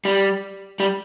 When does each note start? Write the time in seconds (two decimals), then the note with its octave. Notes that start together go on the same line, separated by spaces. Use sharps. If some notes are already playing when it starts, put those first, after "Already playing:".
0.05 G3
0.80 G3